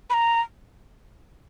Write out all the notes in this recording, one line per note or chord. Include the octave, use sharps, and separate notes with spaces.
B5
A#5